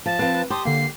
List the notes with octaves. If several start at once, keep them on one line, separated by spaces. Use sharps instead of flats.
F3 A5
F3 C4 B4
B4
G4 A5 C6 D#6
D3 A#3 C7